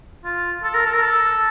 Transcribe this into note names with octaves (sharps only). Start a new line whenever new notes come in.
F4
A4
A#4
A4
A#4
A4